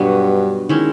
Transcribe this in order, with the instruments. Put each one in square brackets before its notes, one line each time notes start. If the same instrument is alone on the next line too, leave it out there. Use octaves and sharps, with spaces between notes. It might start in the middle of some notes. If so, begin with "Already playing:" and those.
Already playing: [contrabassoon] G2 [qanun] B2 F#3 B3
[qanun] D#3 G#3 C#4 E4